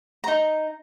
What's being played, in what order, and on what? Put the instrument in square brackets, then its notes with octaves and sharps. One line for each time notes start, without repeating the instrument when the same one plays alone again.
[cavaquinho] D#4 A#5